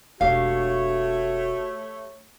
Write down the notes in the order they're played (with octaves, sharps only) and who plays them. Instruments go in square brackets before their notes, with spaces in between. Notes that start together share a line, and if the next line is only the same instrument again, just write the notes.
[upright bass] E1 D4 [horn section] A3 C#5 [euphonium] F#4 [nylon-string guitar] G4 F5